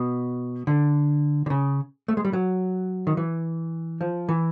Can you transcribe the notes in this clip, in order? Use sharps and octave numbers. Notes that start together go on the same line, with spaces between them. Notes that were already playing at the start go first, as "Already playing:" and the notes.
Already playing: B2
D3
D3
C#3
A3
G#3
G3
F#3
D#3
E3
F3
E3